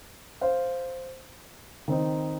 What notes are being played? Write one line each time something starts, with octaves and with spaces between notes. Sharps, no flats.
C5 F5
D#3 C4 D#4